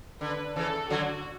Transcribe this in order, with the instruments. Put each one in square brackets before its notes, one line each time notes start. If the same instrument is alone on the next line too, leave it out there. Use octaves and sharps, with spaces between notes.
[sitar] D3 [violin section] B4
[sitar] C#3 E3 [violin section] A4
[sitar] D3 F#3 [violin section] F#4